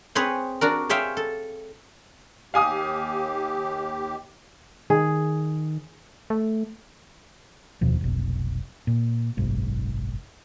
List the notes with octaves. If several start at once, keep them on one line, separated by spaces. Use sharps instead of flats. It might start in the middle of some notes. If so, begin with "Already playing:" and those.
C4 G#4 B4 C#5
D4 F#4 A#4
G#4 C5 C#5 E5 F5 G5
A4
D#2 G4 F5 G#5 D#6
D#3 G#4
A3
F1 D#2 B2 F3
F1 B1
A#2
F#1 B1 G#2